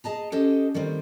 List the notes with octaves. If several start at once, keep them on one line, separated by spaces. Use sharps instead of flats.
G#4 D#5 A5 A#5
C#4 G4 A4 C5 D#5 G5
D#3 G3 A3 C4 E4